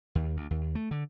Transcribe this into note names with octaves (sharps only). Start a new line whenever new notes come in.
D#2
D2
D#2
A3
D3